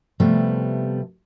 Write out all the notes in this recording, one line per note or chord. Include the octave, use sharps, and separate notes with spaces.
C3 F3 G3 A3 B3